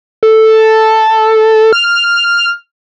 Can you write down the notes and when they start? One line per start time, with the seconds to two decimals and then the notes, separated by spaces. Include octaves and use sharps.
0.23 A4
1.73 F6